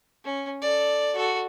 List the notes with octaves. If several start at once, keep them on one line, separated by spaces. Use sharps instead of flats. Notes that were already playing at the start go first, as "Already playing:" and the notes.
C#4
A4 D5
F#4 A4